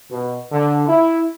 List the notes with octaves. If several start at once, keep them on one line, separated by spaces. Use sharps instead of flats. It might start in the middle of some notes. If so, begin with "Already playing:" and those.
B2
D3
E4